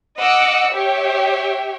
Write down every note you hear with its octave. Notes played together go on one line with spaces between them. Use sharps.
D#5 F#5 D6 E6 C#7
G4 C#5 E5 G5